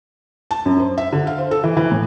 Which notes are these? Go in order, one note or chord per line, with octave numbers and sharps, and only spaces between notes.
A5
F#2
C5
E5
D3
F5
C5
A4
E3
E3
A2